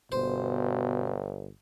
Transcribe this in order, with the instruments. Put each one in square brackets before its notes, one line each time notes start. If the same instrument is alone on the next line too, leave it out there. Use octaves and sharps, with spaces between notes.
[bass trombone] G1 [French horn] B2 [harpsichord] C5